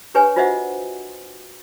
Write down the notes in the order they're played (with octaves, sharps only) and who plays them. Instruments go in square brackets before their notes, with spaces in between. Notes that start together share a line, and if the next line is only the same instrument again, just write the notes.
[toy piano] D4 G4 B4 C#5 G#5
F4 F#4 C5 D#5 E5 F#5